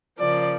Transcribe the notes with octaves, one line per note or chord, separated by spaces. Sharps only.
C#3 F3 A#3 D5